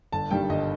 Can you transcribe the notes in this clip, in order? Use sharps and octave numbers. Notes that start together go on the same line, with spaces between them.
G1 A5
G2 D#3 G3 G5
G1 D#5